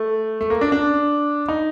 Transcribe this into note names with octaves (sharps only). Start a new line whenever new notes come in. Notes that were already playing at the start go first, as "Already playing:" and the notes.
Already playing: A3
A3
A#3
D4
D4
D#4